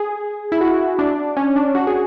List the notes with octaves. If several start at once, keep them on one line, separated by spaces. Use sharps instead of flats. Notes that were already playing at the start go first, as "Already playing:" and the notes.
Already playing: G#4
E4
F#4
D4
C#4
D4
F#4
G#4